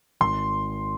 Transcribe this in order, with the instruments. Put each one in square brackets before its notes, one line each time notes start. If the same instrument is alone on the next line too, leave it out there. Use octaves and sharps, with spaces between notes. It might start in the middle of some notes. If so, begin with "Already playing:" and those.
[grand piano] G#1 C6